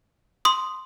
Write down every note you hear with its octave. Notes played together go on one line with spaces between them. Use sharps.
C6 D#6